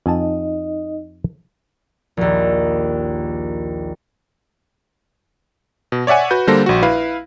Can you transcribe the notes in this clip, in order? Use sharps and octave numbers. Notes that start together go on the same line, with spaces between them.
F2 D#4 D#5 G#5 A5
A#1 D#2
B2
C#5 D5 E5 F#5 G#5
F#4 B4 G6
D3 G3 A#3 A4 C5 A#6
A#1 F#4
E4 B4 F5